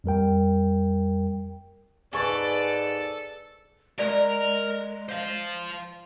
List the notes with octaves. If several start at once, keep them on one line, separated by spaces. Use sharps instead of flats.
F2 G3 A#4 G5
G#2 A4 B4 D5 G#5 C#6 A6
G#3 A#4 D5
C5 F5